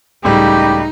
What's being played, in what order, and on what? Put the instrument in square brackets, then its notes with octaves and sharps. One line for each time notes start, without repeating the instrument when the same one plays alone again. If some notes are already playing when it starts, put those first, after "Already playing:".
[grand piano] C#2 A2 G3 [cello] D#4 [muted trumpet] G4